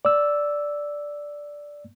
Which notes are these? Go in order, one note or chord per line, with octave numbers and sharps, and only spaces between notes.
D5 E6